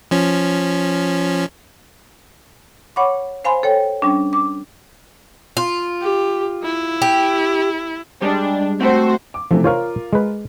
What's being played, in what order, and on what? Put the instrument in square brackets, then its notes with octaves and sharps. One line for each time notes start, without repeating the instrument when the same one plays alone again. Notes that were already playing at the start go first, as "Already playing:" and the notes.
[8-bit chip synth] F3 C#4
[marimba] C#5 F#5 B5 C#6 D6
C5 F5 G#5 B5 C6
A4 C#5 G5
G3 C#4 D4
D6
[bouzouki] F4
[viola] G4
E4
[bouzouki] G4
[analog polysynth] G3 G#3 [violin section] D4
[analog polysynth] A3 C4 [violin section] F#4 C5
[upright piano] D6
[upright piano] C3 E3 A3 [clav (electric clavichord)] F3
[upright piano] F4 A#4 [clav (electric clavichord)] C5 C#5 F5
[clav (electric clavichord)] G#3 B4